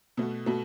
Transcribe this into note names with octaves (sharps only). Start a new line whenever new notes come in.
B2 A3 F#4
B2 A3 F#4